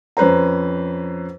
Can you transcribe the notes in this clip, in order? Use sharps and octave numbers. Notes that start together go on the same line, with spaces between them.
F2 C#4 B4 C5 A#5